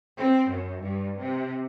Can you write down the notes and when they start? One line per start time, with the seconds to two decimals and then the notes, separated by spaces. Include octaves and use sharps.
0.18 C4
0.49 F#2
0.81 G2
1.18 C3